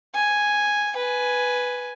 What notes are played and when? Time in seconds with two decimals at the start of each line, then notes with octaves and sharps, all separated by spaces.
0.15 G#5
0.97 B4 G#5